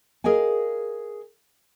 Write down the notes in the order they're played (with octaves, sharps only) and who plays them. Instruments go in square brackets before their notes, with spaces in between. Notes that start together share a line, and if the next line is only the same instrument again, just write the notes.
[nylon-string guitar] G#4 A#4 D#5 F5 G#5